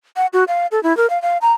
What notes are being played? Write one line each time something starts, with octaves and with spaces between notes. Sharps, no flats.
F#5
F#4
F5
A4
E4
A#4
F5
F5
A#5